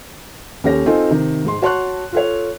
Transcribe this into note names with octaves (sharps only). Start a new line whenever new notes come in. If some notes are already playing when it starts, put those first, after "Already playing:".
D#2 C#4 G4 A4 C#5 A#6
C4 D#4 F4 A4 G#5
C3 D#3 D#4
G#2 G#3 C6
F#4 C#5 A5 C6 C#6 F#6
F4 A4 C#5